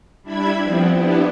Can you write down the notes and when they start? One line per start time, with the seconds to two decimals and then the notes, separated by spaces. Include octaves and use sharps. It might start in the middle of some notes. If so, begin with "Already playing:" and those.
0.23 G3 D4 E4 E5 B5 G#6
0.59 F3 B3 C4
0.93 B3 D4 E4 G4